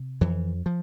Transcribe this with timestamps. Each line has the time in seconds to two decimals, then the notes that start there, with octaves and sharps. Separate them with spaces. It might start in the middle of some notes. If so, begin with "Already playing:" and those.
Already playing: C3
0.21 F2 E3
0.66 F3